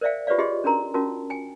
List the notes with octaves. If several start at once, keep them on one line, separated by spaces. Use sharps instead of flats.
A#4 C5 D5 E5 F5 G5
F4 G4 B4 C#5 D5 F5
F4 G4 G#4 D#5 C6
C#4 D4 F#4 A#4 A#5 C6
C#4 F4 F#4 A#4 A5
G5 G#5